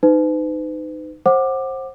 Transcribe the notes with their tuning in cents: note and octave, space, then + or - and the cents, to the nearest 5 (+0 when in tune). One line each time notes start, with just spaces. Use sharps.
D#4 -10 B4 +40
C5 +25 F#5 +0 D6 +15